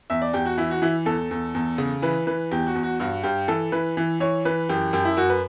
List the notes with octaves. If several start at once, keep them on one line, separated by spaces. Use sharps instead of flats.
E2 E5
D5
E2 G4
F#4
E3 E4
F#4
E3 E4
E2 A4
E2
E2
C#3
E3 B4
E3 B4
E2 G4
F#4
E2
F#4
G2 F#4
G2 G4
E3 A4
E3 B4
E3
E3 C#5
E3 B4
F#2 G4
F#2 G4
E4
F#2 F#4
B4